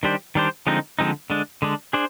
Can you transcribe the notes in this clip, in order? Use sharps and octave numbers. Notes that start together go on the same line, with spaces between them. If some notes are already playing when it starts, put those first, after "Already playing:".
D#3 G3 D4 G4 C5
D#3 G3 D4 G4 C5
D3 F3 G#3 C4 D#4
D3 F3 G#3 C4 D#4
D3 G#3 D4
D3 G#3 D4
D4 G#4 C5